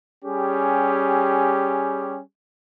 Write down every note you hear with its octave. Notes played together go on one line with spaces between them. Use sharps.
G3 C#4 G4 G#4